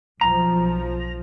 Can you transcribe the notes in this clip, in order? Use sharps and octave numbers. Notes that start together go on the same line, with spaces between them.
B1 F3 A#5